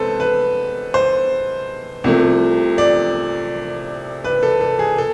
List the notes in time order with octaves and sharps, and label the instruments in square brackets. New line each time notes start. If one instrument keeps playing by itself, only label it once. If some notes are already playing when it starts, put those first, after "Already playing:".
Already playing: [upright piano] C2 C3 G#3 B3 A4 B4 C5
B4
C5
C2 C3 F3 A3
D5
B4
A4
A4
G#4
A4